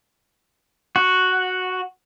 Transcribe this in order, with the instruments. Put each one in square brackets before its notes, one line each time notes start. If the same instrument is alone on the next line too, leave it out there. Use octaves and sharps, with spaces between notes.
[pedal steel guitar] F#4